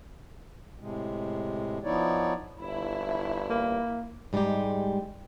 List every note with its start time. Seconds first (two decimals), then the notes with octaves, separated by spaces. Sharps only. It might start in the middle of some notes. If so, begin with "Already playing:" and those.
0.79 A2 C3 G#3
1.84 F3 B3 D#4 E4 C#5 D5
2.60 G1 E4
3.50 A#3
4.33 G#2 G3 G#3 D#4 G4